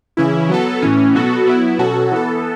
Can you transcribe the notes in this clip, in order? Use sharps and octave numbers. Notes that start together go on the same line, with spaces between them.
C#3 E3 C#4 E4
F#3 B3 A4
A2 E3 C#4
B2 F#3 B3 F#4 A4
F#3 B3 E4
B2 F#3 C#4 F#4 A4
E3 B3 A4